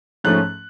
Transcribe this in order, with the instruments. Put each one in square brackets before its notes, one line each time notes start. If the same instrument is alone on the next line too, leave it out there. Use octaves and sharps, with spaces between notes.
[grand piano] G#2 F3 A3 C#4 F#6